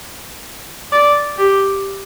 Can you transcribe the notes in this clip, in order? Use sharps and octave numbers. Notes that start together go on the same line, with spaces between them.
D5
G4